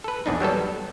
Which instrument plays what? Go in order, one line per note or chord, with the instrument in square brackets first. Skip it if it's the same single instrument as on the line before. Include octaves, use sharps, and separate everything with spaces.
[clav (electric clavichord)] A4 B4
A#1 E2 D4 D#4
F#3 G3 B3 A4